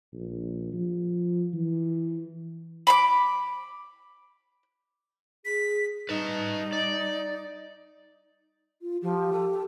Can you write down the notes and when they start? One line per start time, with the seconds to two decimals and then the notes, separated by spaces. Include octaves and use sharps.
0.13 A#1
0.73 F3
1.54 E3
2.87 B5 C6 D6
5.45 G#4 B6
6.09 G3 D#4 B4 A5
6.73 D5
8.82 F4
9.02 F3 G4
9.33 A4
9.54 A4